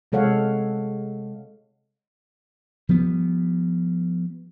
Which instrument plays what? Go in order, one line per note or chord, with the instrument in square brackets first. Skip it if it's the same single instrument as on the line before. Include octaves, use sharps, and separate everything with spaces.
[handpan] C3 G#3 A4 C#5 F5 F#5
[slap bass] F3 G3 B3